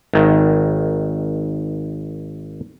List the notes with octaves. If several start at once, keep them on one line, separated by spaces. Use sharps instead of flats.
G#1 D#3